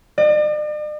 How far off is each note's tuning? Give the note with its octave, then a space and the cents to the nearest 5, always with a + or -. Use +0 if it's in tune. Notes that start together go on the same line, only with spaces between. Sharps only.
D5 +45